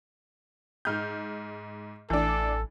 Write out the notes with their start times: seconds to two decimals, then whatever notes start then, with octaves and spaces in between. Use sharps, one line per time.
0.85 G#2 F6 G6
2.10 A1 E3 A3 D4 A4